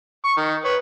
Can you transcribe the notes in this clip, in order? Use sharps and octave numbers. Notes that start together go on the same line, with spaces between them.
C#6
D#3
B4 C#5